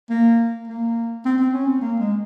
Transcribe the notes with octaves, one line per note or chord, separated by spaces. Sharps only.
A#3
A#3
C4
C4
C#4
C4
A#3
G#3